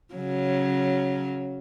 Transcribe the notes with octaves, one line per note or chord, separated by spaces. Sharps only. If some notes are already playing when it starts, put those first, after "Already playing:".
C#3 F#3